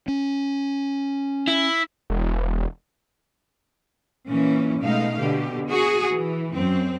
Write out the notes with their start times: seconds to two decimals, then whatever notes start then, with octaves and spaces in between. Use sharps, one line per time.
0.08 C#4
1.48 E4
2.10 E1
4.27 A#2 E3 C#4
4.80 B2 G#3 A3 D#4 F5
5.19 B2 D3 G4
5.68 F#4 G#4
6.10 E3
6.53 F#2 C4